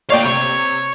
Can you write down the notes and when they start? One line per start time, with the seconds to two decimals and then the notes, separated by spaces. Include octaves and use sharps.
0.10 A#2 C#5 D5 F5 G5
0.25 C3 C#5